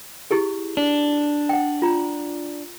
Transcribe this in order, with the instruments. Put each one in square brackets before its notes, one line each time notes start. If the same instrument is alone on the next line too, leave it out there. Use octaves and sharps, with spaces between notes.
[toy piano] E4 G4 G#4
[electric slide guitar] D4
[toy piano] F#5 G5
F4 A#5